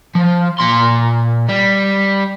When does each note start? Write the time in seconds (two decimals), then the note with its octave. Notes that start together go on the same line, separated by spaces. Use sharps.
0.15 F3
0.59 A#2 C6
1.49 G3